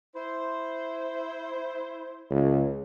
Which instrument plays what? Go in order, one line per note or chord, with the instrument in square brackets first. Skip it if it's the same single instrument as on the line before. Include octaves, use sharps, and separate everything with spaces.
[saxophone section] E4 C5
[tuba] C#2